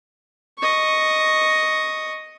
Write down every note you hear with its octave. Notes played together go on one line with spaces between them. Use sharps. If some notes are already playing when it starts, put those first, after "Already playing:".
D#5 C#6